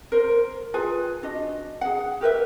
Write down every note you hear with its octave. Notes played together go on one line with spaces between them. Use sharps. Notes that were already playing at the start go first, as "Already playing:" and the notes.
A#4 C5
F4 G#4 B4 G#5
D4 F#4 D#5
G#4 F#5
G4 A#4 B4 E5